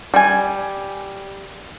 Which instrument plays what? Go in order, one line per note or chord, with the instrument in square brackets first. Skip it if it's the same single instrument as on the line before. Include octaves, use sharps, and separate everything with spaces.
[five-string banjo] G3 G#5